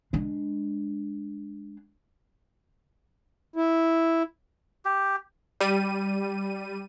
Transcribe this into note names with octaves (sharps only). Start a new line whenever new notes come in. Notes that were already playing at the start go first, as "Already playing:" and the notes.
G#3 D4
E4
G4
G3 D#7